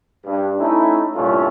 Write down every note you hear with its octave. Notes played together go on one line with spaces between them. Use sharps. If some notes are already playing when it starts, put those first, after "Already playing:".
G2
A3 C#4 D#4 E4
C2 G2 A#2 A3 C#4 F4